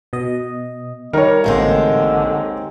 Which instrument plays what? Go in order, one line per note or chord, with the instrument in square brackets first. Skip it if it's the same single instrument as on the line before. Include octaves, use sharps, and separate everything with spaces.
[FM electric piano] B2 D#5
[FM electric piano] D#3 [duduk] G3 [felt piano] A#4 C#5
[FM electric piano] A1 A#3 [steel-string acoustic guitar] D#2 G#3 C4 [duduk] D3